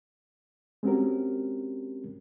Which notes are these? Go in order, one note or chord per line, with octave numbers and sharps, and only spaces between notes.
G#3 C4 C#4 F#4 G4 A#4